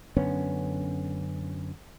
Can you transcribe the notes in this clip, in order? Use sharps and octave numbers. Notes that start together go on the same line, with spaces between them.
F#2 D3 B3 C#4